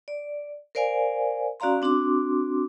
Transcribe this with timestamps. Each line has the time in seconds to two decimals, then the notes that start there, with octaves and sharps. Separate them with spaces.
0.08 D5
0.75 A#4 C5 D5 F5 G#5
1.60 C#4 F#4 D5 F5 A#5 C6
1.82 C4 D4 F#4 C6 D6